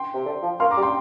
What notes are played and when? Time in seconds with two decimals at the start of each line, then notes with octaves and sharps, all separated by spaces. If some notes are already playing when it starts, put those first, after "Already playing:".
Already playing: G5 C6
0.14 C3
0.26 D3
0.43 F3
0.60 A#3 C6 F6
0.71 A#5 D6
0.77 G3
0.83 G5 C6